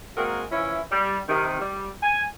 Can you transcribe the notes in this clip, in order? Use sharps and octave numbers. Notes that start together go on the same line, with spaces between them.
G#3 A#3 C4 F#4 G#4 A#4
E3 F3 C#4 E4
G3
C3 D#3
G3
G#5